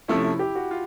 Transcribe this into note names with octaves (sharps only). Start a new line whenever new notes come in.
C3 F3 A3 C#4 E4
E4
G4
F#4
F4